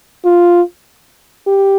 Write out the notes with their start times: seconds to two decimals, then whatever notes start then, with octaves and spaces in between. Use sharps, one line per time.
0.25 F4
1.47 G4